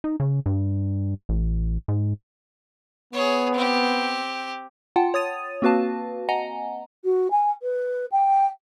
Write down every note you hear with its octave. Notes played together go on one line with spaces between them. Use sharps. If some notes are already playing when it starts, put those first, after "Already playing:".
D#4
C#3
G2
A1
G#2
B3 G#4 C#5
C4 G4
F4 F#5 G5 A5
C#5 D#6 A6 D#7
A#3 C4 F#4 B4 F5 A5
D#5 F#5 G#5 A#5
F#4
G#5
B4
G5